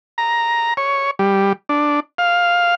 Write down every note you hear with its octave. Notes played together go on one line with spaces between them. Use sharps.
A#5
C#5
G3
D4
F5